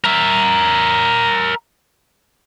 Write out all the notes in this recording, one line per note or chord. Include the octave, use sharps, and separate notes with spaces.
A#4 E5